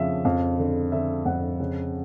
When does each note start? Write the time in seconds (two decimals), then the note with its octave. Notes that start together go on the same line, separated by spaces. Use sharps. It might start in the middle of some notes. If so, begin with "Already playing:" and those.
Already playing: F2 C#3 F3 E5 F5
0.25 F2 F5
0.59 D3
0.92 D3 E5
1.26 F2 F#5
1.60 C#3